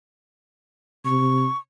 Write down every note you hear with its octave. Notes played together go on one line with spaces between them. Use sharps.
C3 C#6